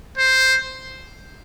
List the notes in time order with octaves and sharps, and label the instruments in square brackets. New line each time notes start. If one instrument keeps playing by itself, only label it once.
[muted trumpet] C5